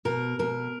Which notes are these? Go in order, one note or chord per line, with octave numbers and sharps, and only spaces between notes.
B2 A#4
B2 A#4